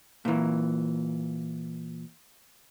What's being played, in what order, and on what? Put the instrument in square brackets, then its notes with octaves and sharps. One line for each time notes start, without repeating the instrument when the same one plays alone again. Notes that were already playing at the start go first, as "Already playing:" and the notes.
[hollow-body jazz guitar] A#2 E3